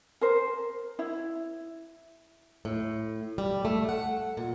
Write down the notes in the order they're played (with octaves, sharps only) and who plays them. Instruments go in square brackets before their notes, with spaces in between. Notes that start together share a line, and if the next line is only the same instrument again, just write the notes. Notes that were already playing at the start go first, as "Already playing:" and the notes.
[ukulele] A#4 C5
E4
[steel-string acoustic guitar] A2
G3
A3
F#5
A#2